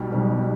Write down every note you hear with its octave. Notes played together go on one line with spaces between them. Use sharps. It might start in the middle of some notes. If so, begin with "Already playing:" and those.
Already playing: B1 B2 G3
B1 B2 G3